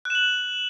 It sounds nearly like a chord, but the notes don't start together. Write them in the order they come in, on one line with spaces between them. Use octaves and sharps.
F#6 E7 F#7